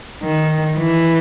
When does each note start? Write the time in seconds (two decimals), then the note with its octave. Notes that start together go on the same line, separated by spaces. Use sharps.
0.23 D#3
0.79 E3